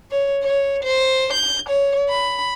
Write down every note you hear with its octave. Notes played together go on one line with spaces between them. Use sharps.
C#5
C#5
C5
G6
C#5
B5